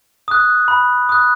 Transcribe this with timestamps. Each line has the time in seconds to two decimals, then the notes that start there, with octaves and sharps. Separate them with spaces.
0.28 D#6 F#6
0.68 B5
1.09 D#6 F#6